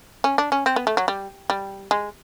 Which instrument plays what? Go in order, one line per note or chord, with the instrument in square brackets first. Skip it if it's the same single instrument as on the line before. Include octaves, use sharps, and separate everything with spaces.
[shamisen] C#4
D4
C#4
C4
B3
A3
F#3
G3
G3
G#3